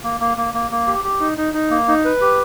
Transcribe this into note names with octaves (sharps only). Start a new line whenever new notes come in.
A#3
A#3
A#3
A#3
A#3
G4
G4
D#4
D#4
D#4
A#3
D#4
B4
G4